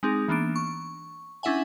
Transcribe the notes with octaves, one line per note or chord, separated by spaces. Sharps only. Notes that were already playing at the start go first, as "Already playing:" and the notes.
G#3 C4 D#4 G#4
E3 A#3 B3 D4 D7
C#6
C#4 D4 E4 E5 F#5 G#5